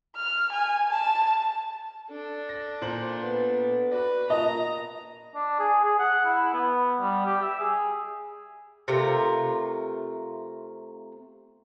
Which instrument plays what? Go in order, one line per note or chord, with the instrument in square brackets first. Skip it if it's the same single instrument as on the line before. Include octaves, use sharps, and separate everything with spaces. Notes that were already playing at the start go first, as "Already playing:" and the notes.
[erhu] F6
G#5
A5
[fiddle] D4 A4
[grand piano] A#6
A#2 C5 F#7
[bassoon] B3
[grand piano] F#4 D5 [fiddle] B4
[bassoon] A#2 [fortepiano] D#5 [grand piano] A5 [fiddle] A#5
[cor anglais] D4
G#4
G#4
F#5
E4
B3
G3
G4
E5
G#4
[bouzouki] C3 A3 F4 A#4